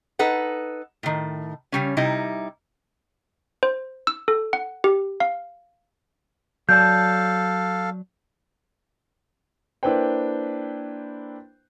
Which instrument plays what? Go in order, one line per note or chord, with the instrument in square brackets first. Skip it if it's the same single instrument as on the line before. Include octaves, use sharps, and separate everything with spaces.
[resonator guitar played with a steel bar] D#4 A4 B4 F#5
A2 D#3
C#3 G3 C#4
C3 G3 D#4 E4
[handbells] C5
E6
A4
F#5
G4
F5
[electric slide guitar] F#3 D5 A5 [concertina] A4 F5 [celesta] G6
[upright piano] A#3 D4 E4 B4 C5 G5